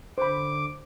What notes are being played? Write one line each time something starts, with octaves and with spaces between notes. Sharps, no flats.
D3 C5 B5 D6